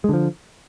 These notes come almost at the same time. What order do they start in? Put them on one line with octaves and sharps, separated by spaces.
G#3 D3 F3